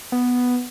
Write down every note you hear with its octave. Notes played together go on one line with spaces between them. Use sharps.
B3